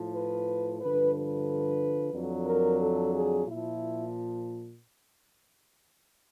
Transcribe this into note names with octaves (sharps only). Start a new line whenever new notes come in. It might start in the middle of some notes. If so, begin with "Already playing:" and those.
Already playing: A2 F3
B4
G2 D3 F3 B4
B4
F2 D3 F#3
A#4
A4
G#4
A#2 F3 E4